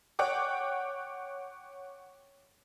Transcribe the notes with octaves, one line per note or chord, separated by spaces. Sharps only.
C#5 F#5 G5 D6